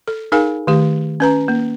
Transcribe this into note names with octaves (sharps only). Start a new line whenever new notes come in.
A4
D#4 G#4 A#4 F5 G#5
D#3 A3 G4
C#4 B4 A#5
A#3